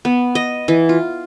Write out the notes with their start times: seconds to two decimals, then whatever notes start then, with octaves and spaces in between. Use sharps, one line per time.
0.05 B3
0.35 D#5
0.68 E3
0.89 F4